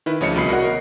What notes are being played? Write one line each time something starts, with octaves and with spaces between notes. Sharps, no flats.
D#3 E4 B4
D2 C#3 F3 C#5 D#5 C#7
C2 B2 B5 C7
F#4 A#4 D5 D#5 F#5
A#4